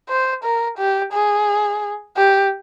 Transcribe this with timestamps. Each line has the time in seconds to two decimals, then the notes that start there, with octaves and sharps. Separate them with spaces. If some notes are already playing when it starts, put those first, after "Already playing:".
0.09 C5
0.44 A#4
0.78 G4
1.13 G#4
2.16 G4